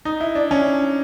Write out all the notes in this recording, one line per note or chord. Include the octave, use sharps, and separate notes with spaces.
D#4
E4
D4
C#4